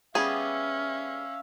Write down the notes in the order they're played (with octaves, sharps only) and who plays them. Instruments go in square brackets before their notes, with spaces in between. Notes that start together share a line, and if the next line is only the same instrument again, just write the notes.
[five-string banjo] G3 B3 G#4 [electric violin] C#4 [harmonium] E5 F5